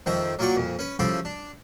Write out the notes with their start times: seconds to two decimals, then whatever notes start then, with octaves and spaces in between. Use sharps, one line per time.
0.06 F2 D#3 F3 C4 E5 A#5
0.39 F#3 A#3 F4 D5 G5 C#6
0.56 F2 A#2
0.79 C#4 B4
0.99 C#3 F3 E4 G4 A4 C5
1.25 D4